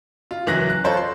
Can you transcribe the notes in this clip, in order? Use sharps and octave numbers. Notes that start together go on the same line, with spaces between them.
F4
C#2 E3 F#3 F#6 A#6
F#6
F4 A4 C5 C#5
C6